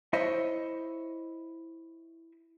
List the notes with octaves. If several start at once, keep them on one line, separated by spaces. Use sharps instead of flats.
E4 C5 C#5 D#5 E5